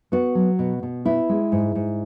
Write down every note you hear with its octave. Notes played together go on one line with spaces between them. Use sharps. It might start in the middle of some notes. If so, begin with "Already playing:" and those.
B3 F#4
F#3
B2
B2
B3 E4
G#3
G#2
G#2